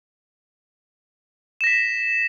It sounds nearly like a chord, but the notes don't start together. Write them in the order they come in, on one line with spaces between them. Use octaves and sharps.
E7 A#6 B6